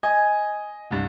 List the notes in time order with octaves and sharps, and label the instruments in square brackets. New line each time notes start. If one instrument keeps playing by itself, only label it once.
[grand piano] D#5 [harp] G#5
[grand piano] C2 G2